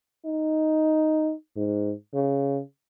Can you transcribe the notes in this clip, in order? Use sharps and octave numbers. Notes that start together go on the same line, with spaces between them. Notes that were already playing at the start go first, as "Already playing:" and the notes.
D#4
G#2
C#3